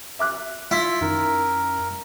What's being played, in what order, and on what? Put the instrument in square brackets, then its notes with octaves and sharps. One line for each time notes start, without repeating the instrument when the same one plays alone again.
[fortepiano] E5 D6 F#6
[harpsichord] E4 [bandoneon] F4
[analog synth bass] F#2 [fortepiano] D#3 [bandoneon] A#4